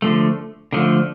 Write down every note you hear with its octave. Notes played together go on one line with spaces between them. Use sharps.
D3 F3 A3
D3 F3 A3